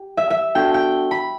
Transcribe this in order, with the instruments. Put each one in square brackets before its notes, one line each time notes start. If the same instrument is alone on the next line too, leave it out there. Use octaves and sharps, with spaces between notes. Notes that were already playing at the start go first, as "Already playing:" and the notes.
Already playing: [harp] G4
E5
E5
[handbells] B3 D4 F#4 A4 [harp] G5
[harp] G5
B5